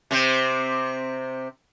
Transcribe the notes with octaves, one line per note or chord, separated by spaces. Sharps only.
C3 C4